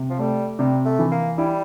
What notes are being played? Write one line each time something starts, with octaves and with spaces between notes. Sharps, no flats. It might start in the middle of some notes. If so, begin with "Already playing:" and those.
Already playing: C3
F3
G3 A3
C3 G3
A3
E3
A#3
G3 E4